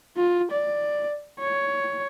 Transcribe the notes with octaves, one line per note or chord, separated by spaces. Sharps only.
F4
D5
C#5